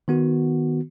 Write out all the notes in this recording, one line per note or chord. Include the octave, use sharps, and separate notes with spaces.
D#3 B3 F#4